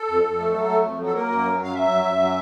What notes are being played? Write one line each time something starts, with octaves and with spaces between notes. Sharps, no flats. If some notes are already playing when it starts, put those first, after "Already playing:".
Already playing: A4
F2
F2
A3
F#3
A3
F2
F#3
A4
A#3 A#4
F#2
F#3
F#2 F5
F#3 E5
F#2
F#2
F#3